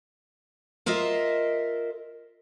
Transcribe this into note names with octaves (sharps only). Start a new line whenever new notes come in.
F4 A#4 C5 D#5 E5